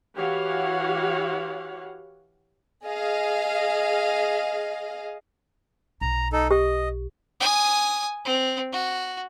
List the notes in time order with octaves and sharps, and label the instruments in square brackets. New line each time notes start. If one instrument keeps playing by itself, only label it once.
[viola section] E3 F#4 G4 C#5 F5 F#5
[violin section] G#4 D#5 F5
[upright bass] B1 [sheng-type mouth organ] A#5
[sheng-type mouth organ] D#4 A4
[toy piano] G4 [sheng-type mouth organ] D#5
[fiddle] G#5 D#6
C4
F#4